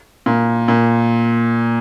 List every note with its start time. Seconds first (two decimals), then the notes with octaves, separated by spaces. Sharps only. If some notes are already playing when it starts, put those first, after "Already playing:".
0.26 A#2
0.68 A#2